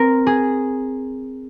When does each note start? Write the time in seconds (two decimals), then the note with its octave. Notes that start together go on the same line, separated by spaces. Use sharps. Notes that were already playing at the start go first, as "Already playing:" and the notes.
Already playing: C4 A#4
0.27 G#4